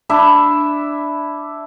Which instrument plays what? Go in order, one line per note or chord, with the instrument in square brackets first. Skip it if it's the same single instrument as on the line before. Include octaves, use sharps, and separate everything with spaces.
[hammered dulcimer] D4 E4 E5